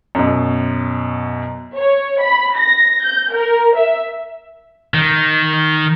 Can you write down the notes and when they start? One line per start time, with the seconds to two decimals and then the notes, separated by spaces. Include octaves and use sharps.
0.15 F#2 B2
1.77 C#5
2.22 B5
2.57 A#6
3.06 G6
3.35 A#4
3.76 E5
4.94 D#3